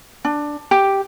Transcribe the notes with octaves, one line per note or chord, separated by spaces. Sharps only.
D4
G4